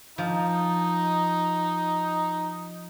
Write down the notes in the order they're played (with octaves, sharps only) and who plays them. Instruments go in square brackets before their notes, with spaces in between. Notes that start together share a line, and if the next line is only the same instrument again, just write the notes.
[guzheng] F3 [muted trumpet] D#4